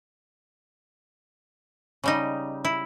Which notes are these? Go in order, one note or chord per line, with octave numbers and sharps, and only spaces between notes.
C#3 G3 D#4
E4